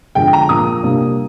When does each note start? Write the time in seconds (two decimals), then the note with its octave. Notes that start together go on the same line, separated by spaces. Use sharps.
0.15 F2 D3 G#3 G5
0.33 A#5
0.49 A#2 F3 A#3 D#6
0.83 C3 G3 A#3 D4